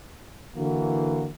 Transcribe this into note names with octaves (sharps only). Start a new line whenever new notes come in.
D3 E3 A#3 F#4